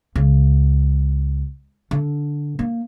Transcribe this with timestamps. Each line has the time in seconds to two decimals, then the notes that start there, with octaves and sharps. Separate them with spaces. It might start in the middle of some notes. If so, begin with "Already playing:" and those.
0.16 C#2
1.91 D3
2.59 A#3